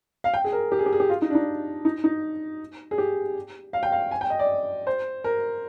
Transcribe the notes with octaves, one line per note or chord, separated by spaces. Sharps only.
F5
G5
G#4
A#4
G4
G#4
G4
G#4
G4
F4
D#4
D4
D#4
D#4
D#4
G#4
G4
F5
G5
F5
G#5
G5
D#5
D5
C5
A#4